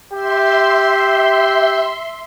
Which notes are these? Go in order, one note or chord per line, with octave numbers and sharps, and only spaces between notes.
G4 E5 C6